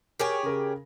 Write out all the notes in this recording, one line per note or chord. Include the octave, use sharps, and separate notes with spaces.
G4 G#4 A#4 C#5 G#5
C#3 A#4